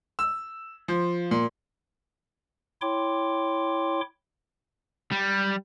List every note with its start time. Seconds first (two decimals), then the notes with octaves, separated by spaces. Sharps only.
0.19 E6
0.88 F3
1.31 A#2
2.82 E4 C#5 G5 C6 D6
5.12 G3